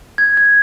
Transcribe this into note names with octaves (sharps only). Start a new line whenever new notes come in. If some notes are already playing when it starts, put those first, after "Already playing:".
G#6
G#6